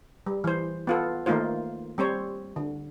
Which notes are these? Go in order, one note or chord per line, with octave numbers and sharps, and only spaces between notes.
G3
E3 C5
B3 F4 A4
D#3 A3 A#3 D#4 F4 C5
G3 C4 C5 C#5
D3